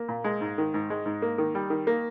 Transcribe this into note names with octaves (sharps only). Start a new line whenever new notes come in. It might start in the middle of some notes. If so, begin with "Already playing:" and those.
Already playing: A#3
A#2
G#3
G#2
D#3
G#2
G#3
G#2
A#3
D#3
G3
D#3
A#3